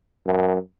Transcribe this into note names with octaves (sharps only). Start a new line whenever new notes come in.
F#2